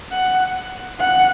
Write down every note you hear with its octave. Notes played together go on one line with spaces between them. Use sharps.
F#5
F#5